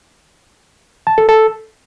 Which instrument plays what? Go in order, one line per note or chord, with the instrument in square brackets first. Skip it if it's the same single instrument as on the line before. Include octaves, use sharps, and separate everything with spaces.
[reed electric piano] A5
A4
A4